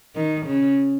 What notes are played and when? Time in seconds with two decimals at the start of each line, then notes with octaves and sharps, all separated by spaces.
0.16 D#3
0.46 C#3